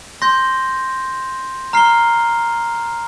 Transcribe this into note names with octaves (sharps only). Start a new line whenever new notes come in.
C6 G6 A#6
A#5 F6 C7 G7